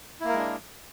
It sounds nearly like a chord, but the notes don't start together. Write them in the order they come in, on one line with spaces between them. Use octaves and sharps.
E4 A#3 A#4 G#3 D4